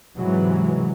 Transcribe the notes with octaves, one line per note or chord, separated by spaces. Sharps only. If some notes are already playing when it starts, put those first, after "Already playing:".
G#2 C3 E3 F#3 G#3